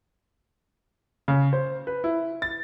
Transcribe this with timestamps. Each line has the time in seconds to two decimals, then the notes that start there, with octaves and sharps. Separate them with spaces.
1.28 C#3
1.53 C5
1.87 B4
2.04 E4
2.42 A6